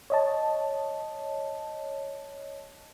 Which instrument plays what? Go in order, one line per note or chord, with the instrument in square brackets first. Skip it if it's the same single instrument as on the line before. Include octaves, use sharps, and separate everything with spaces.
[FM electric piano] C#5 D#5 A5